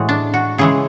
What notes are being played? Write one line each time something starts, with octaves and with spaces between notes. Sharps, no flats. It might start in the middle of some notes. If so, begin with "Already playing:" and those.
Already playing: A2 E3 G#3 F#4
D4
F#4
C#3 E3 G#3 G#4